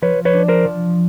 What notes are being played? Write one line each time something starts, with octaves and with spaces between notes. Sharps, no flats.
F3 B4 C#5
B4 C#5
D4
A#4 C5
F3